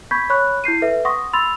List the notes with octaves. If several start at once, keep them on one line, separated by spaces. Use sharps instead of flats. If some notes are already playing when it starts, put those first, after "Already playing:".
B5 C#6 G6 G#6 B6
C#5 B5 C#6 F#6
E4 G6 C7 D#7
A4 B4 E5
F#5 C6 C#6 D#6 A#6
B5 C6 E6 A6 F7